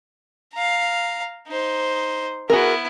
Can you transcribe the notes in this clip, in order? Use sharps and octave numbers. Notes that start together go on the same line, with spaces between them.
F5 A#5
D#4 C5
B3 E4 F#4 G#4 A#4